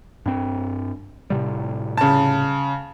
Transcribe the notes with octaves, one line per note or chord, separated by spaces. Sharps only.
G2 C4
A2 C3 G3
C#3 A5